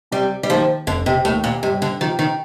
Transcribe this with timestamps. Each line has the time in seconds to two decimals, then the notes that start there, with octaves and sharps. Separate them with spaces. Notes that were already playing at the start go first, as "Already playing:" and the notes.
0.12 C3 G3
0.43 G3
0.49 D#3 F3 A#3 D#4 G4
0.87 F1 D3
1.06 C3
1.25 D#2 A2 D#3 A3
1.44 A#2
1.63 G2 C3
1.82 D3
2.00 D#3 F3 C4 G4
2.19 D#3